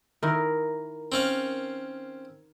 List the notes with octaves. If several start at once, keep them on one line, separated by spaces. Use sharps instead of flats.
D#3 E4 A#4
C4 C#4 F5